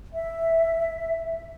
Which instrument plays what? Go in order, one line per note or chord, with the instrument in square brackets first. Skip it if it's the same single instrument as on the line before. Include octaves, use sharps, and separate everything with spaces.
[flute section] E5